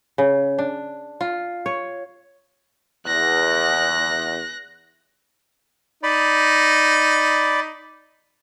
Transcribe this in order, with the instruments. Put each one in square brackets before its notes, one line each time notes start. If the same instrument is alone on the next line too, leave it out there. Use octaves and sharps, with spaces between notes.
[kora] C#3
D4
F4
C#5
[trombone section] E2 [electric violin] F#6 A#6
[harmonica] D#4 [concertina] D5 B5